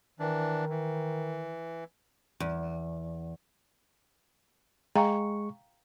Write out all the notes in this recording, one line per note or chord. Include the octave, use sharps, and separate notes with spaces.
D#3 E3 D4
E3
E2
G#3 F5 G5 A#5 C#6